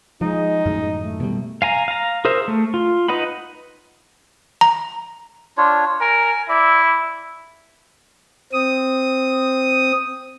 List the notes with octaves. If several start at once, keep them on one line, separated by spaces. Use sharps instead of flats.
F3 G#3 D#4
F#2 A2 D#3
A3
B2 G3
F5 G#5 A#5
F5 A#5
G#4 A#4 C5 E5
A3
F4
D#4 B4 D#5 F#5 B5
A#5
D4 F4 C#5
A#4 G#5
E4 D5
C4 D#6